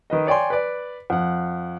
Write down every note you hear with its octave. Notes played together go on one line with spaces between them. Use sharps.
D#3 B4 D#5
C#5 D5 G5 G#5 C6
B4 D5
F2 F#5